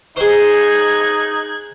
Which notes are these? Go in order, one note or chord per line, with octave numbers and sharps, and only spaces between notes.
D#4 G#4 C5 F#6 G#6